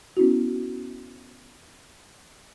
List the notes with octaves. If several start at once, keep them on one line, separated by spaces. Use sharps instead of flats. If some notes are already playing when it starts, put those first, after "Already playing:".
B3 C#4 E4 F#4